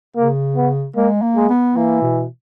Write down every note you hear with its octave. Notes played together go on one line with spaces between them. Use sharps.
C#3 A#3
B3
G#3 A#3
A#3
G#3
B3
E3 A#3
B2